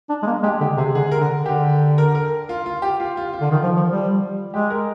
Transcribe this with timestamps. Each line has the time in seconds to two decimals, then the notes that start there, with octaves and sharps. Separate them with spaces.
0.10 D4
0.23 G#3
0.26 A#3
0.43 G#3 G4
0.61 D3 G4
0.77 C3 G#4
0.95 D3 G#4
1.11 A#4
1.20 D3
1.46 D3 G4
1.98 A#4
2.15 A#4
2.49 F4
2.66 F4
2.82 G4
3.00 F4
3.17 F4
3.33 F4
3.41 D3
3.51 D#3 F4
3.63 F3
3.76 F3
3.89 G3
4.53 G#3 G4
4.70 A#4